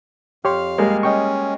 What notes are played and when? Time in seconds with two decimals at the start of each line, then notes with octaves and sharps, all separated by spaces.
0.45 F2 G4 C#5 F5 C6 F6
0.78 G3 G#3 A#3
1.03 C#4 D#5 G5 C#6